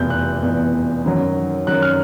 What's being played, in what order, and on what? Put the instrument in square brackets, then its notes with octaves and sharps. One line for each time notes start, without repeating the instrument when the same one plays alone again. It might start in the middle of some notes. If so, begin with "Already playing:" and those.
Already playing: [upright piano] F1 E2 B2 G6
F#6
F1 E2 B2
F#2 D#3 F#3
F#2 D#3 F#3 F#6
F6